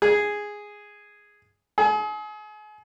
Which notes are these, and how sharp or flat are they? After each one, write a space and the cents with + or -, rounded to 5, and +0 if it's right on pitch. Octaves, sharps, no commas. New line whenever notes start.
G#4 -5
G#4 +35